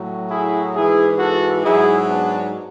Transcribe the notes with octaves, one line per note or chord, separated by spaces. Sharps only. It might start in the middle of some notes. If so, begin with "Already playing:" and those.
Already playing: A2 F#3
E4 G#4
G#2 E3 E4 G#4
F#4 A4
G#2 F#3 E4 G#4
B3 D4